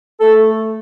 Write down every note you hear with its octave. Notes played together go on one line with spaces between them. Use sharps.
A3 A4